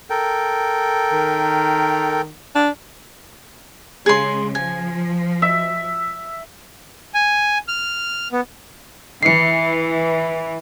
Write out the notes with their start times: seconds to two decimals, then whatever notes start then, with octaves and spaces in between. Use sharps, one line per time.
0.10 A4 A#4 G5
1.13 D#3
2.55 D4
4.06 C#3 G#3 G#4 C6
4.55 F3 G#5
5.42 E5
7.14 G#5
7.68 F6
8.32 B3
9.23 E3 C7 C#7